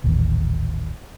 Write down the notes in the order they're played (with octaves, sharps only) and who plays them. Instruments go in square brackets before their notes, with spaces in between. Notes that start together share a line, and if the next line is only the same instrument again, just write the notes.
[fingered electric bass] D#1 A1 D#2